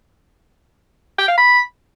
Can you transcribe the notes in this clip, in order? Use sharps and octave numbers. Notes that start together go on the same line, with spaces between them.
G5
F5
B5